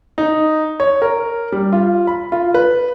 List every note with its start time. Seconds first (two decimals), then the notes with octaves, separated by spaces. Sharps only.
0.18 D#4
0.80 C#5
1.02 A#4
1.52 G3
1.72 F4
2.07 B5
2.32 F4
2.54 B4